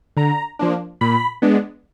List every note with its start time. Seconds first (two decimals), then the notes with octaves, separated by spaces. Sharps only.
0.17 D3 A#5
0.59 F3 A#3 D4
1.01 A#2 B5
1.42 G#3 B3 D4